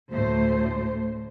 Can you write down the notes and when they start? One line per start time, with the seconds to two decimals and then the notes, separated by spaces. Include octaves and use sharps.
0.11 D2 A2 A3 C5